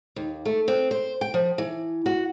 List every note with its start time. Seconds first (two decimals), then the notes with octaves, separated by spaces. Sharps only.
0.16 D#2
0.45 A3
0.68 C4
0.91 C5
1.21 G5
1.34 F3
1.58 E3
2.06 F#4